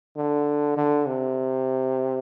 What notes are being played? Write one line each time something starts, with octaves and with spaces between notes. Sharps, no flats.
D3
D3
C3